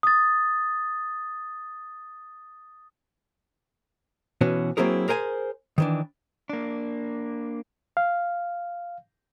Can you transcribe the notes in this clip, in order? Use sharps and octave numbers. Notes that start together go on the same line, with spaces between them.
D#6 A6
B2 E3 C#4 F#4
F#3 A#3 C4 E4 G#4 A#4
G#4 A#4 C5 G5 G#5
D#3 E3 D4
A#3 D4
F5